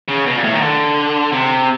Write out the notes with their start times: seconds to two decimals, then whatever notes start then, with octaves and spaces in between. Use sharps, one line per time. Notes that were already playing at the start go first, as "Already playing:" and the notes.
0.08 C#3
0.26 B2
0.35 A#2
0.44 A2
0.53 D#3
0.61 D3
1.32 C3